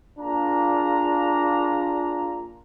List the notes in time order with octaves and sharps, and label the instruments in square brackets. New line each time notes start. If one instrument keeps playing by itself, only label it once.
[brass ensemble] A#3 D4 F4 G#4 A#5